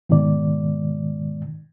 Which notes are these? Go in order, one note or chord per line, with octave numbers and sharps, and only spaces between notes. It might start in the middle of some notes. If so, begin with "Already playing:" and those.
G#2 B2 D#3 G#3 D5